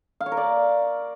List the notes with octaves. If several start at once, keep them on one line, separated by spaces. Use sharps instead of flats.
F5
C#5
A#4
D5